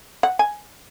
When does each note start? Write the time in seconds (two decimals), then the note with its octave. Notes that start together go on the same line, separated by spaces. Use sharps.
0.23 F#5
0.39 G#5